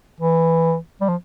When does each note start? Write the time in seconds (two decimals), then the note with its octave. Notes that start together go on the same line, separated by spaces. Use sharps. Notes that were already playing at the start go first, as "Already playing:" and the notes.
0.20 E3
1.01 G3
1.08 F3